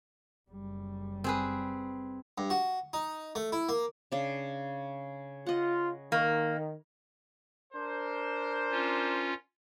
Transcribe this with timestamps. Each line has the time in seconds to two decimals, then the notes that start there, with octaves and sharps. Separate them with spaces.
0.51 F#1 G3
1.24 C4 G#4 B4
2.38 G2
2.50 F#4
2.93 D#4
3.35 A3
3.52 E4
3.69 A#3
4.12 C#3 D4
5.46 F4 D#5 F#5
6.12 D#3 A#3
7.73 D4 A#4 C5
8.71 C#4 F4